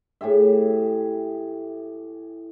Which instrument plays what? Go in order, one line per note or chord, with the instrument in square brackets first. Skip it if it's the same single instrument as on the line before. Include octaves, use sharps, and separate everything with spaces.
[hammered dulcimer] A2 G4 G#4 E5